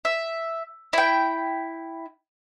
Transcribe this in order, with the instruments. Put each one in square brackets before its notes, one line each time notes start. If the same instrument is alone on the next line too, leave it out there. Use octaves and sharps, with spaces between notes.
[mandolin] E5
E4 G5